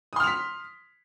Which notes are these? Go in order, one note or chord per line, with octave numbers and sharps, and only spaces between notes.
C6 D#6 F6 B6 F7